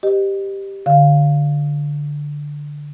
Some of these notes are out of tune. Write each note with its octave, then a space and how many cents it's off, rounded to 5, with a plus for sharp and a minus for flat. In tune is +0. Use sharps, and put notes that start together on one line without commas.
G4 +0 B4 +40 D#5 -25
D3 +0 F5 +0